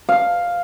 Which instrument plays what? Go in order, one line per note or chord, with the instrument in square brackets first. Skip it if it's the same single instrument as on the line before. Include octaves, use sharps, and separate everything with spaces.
[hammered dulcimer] F5